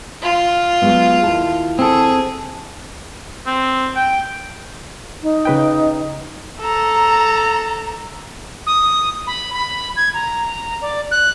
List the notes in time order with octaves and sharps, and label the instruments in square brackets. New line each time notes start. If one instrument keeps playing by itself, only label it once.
[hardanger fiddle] F4
[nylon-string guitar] F#3 G#3 B3
D#2 E4 A5
[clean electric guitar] C4 A4 [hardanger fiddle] G#4
[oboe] C4
G5
[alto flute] D#4
[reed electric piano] C#3 B4 G5
[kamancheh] A4 A#5
[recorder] D#6
B5
B5
G#6
A#5
D5
F#6